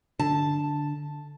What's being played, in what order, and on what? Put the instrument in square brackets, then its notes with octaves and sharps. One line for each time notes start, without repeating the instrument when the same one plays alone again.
[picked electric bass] D3 [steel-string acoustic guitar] A5